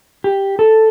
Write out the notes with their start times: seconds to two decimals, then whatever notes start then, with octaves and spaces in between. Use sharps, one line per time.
0.24 G4
0.59 A4